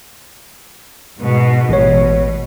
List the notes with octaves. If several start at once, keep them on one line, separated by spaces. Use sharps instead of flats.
G#2 B2
A1 B2 C#5